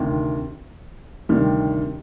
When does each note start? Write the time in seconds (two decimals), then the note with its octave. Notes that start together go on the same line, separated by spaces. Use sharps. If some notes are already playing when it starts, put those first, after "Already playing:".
Already playing: D2 C3 D#3
1.29 D2 C3 D#3 G3